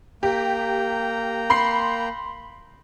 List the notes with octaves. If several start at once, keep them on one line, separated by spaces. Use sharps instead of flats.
A#3 G4 G5 A#5
B5 C6 C7